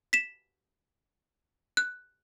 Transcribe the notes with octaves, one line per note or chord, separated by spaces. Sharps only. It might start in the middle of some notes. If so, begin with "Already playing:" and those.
B6 E7
F#6